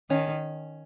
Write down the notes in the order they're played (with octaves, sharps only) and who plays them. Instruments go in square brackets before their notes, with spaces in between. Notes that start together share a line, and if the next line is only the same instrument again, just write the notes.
[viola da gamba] D#3 [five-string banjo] C#4